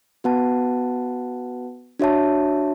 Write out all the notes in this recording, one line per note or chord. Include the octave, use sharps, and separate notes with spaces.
B3 F#4 B4 F#5 A5
D4 F#4 C#5 E5 A5